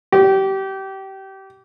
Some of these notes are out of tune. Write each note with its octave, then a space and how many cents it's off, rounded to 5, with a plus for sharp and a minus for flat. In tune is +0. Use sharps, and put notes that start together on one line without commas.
G4 -25